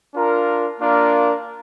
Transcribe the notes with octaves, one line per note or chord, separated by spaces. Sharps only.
D4 F4 A#4
A#3 D4 F4 A#4